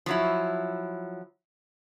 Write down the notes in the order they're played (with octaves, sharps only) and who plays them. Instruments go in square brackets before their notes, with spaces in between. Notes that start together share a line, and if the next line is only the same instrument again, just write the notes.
[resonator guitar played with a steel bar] F3 F#3 E4